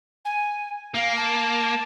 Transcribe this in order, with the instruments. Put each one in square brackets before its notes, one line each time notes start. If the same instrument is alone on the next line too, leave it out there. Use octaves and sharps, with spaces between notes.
[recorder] G#5
[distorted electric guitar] A#3 [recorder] F5
[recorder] A5